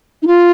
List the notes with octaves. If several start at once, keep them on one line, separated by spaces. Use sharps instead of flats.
D#4
F4